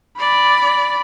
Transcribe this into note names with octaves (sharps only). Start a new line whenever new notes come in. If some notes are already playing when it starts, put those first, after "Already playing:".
D5 B5